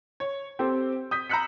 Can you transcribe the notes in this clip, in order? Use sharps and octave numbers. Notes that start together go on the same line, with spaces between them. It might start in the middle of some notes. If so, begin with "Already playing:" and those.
C#5
C4 G4 A4 C5
D#6 G6 B6
A#5 B5 E6 F#6 B6 C#7